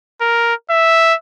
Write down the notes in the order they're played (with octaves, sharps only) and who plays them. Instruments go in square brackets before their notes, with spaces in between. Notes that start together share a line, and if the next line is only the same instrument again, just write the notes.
[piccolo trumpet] A#4
E5